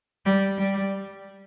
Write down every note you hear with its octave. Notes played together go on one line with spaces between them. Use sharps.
G3
G3